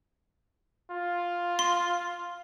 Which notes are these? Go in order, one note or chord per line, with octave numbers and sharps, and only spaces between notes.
F4
C6